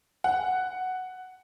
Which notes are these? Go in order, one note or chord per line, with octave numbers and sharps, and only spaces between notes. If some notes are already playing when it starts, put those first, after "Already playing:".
F#5